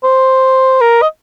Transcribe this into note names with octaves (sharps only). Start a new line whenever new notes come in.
C5
A#4
D#5